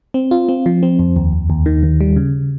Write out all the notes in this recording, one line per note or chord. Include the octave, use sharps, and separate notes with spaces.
C4
F4
C4
F3
C4
F2
D#2
D#2
D#2
D#3
D#3
G3
C#3